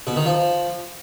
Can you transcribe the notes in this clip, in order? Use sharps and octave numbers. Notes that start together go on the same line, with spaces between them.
B2
D#3
F3